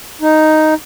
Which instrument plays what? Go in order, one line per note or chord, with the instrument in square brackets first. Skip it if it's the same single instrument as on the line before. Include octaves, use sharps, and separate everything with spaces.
[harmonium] D#4